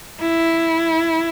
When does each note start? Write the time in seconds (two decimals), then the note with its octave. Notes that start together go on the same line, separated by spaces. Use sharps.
0.21 E4